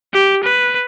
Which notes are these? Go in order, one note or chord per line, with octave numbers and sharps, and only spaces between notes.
G4
B4